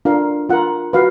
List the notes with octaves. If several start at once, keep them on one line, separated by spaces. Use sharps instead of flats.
D4 F4 A#4 F5
F4 A#4 F#5
F#4 B4 F5